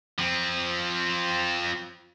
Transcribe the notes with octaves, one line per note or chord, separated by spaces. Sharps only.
F3 C4